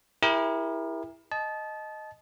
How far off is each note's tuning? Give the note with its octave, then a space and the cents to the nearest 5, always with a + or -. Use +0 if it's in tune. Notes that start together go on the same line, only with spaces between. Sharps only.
E4 +0 G4 +45 A#4 +20
D#5 +0 A5 -25